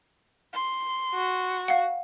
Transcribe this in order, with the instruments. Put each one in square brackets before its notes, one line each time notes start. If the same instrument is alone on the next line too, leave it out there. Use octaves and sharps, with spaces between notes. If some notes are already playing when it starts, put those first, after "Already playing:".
[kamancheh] C6
[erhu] F#4
[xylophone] F5 F#5